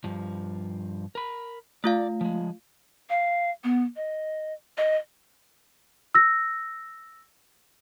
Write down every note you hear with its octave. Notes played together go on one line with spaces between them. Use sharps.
G2 F3
A#4 B5
A3 F4 D5 F5
F3 G#3
F5
B3
D#5
D#5
E6 A#6